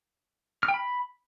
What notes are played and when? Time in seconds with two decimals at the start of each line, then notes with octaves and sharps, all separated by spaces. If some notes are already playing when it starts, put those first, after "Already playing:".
0.63 F6
0.68 G5
0.74 B5